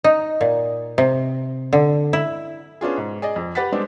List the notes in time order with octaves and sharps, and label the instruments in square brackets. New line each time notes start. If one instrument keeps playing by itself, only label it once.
[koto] D#4
A#2
C3
D3
E4
[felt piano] B3 C#4 D4 F4 G#4
G#2
G#4 D5 D#5
F2
G4 B4 F#5 A6 B6
G3 G#3 B3 C4 D4